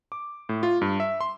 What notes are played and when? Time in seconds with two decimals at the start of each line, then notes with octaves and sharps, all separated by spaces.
0.12 D6
0.49 A2
0.63 F4
0.82 G2
1.00 E5
1.21 C6